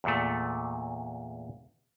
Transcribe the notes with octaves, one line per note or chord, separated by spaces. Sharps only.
E2 A#2 A3